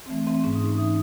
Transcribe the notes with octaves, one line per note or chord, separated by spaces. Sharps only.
C4
E3 A3
E3 C4
G#2 C#4
D#4
G#2
C#4
E3 D#4